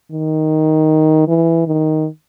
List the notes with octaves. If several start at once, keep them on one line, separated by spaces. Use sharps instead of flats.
D#3
E3
D#3